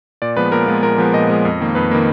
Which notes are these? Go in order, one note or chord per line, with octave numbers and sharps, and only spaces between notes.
A#2 D5
F3 G#3 B3 B4
A#2 A#4
F3 G#3 B3
A#2 A#4
F3 G#3 B3
A#2 D#5
F3 G#3 B3
F2
D#3 A#3
F2 B4
D#3 A#3